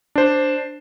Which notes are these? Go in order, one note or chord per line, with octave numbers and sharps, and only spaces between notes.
D4 C5